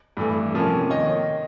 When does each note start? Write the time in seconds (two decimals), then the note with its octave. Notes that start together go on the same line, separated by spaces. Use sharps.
0.17 G2 E3 A3
0.54 C3 F3 A#3 C#4
0.90 D#3 C#5 D#5